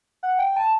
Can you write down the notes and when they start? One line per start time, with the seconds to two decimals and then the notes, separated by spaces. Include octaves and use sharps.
0.23 F#5
0.39 G5
0.56 A5